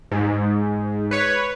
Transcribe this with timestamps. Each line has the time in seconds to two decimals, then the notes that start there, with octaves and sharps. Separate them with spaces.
0.12 G#2
1.11 B4 C#5